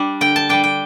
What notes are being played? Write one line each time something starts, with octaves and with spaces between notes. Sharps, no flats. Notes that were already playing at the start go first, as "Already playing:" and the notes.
Already playing: G3 D4
D3 G5
A5
G3 D4 G5
G5